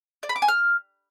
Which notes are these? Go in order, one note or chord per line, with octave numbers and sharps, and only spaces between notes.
D5
B5
D6
G#5
F6